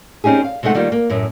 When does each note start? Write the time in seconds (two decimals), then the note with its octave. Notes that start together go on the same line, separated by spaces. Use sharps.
0.24 C4 C#4 D#4 G4 G#4
0.44 F5
0.63 C3 G#3 A3 D#4 F#5
0.75 D#3 G3 A#3 F4
0.92 A#3
1.10 F#2 A2